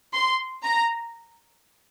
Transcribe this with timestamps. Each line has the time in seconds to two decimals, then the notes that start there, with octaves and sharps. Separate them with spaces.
0.15 C6
0.65 A#5